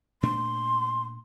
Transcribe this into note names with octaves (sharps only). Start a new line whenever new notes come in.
A#2 A3 D4 C6